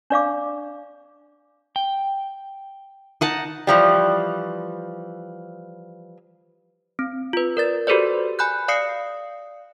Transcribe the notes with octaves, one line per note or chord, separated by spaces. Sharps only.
D4 D5 F5 D6
G5
D#4 F#5 A5
E3 F3 G3
C4
F4 B4
A#4 D5 A6
F#4 G4 A4 B4 C5 D5
G#5 B5 F#6 G6
D5 F5 D#6 C7 C#7